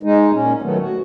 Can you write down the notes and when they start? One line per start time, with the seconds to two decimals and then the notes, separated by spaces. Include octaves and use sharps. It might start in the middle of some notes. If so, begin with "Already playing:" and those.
0.03 G#3 D#4
0.33 A#2 C#4
0.62 D#3 F#3 A3 B3
0.79 F#4